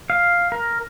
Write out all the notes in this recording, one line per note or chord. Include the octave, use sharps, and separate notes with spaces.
F5
A#4